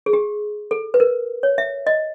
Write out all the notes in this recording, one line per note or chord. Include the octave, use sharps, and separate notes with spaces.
G#4
G4
A4
B4
A#4
C#5
E5
D#5